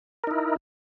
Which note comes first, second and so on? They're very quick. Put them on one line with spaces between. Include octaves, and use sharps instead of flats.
A#4 D#4 E4